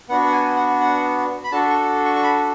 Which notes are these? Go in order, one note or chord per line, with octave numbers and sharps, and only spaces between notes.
B3 D4 F#4 F#5
F#5
G#5
F#5
F#5
B5
D4 F#4 A4 A5
C#6
C#6
C#6
B5